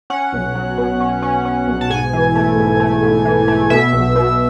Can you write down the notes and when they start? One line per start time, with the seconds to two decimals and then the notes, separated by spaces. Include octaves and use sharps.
0.10 C#4 F#5
0.33 B1
0.55 F#3
0.78 B2
1.00 C#4
1.22 C#4
1.45 C#4
1.67 B1
1.81 A5
1.90 G#2 G#5
2.13 E3
2.35 A3
2.58 G#2
2.80 A3
3.03 G#2
3.25 E3
3.48 A3
3.70 B2 E5
3.93 B1
4.16 B2